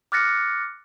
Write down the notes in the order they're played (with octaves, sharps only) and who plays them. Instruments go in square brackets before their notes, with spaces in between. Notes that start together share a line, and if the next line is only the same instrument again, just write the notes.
[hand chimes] D6 F6 F#6 A6 A#6 C#7